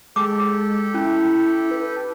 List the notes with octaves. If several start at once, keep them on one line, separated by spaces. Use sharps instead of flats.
G#3 G4 A4 D6
C#4 E4
B4